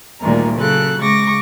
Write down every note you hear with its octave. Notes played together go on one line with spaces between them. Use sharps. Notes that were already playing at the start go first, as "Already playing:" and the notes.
D2 A#2 D#3 G3 G#3 A#4
C#3 F#3 A4 F#6
C#3 G#3 C#6 D6 A#6